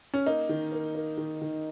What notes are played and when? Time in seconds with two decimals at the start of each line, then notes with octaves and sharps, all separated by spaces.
0.14 C#4
0.26 A#3 D#4
0.49 D#3
0.72 A#3
0.95 A#3
1.17 D#3
1.41 D#3